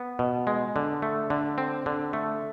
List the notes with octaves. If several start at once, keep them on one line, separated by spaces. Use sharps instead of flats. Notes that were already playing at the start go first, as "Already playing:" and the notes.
Already playing: B3
B2
G#3
D3
A3
D3
C4
D3
A3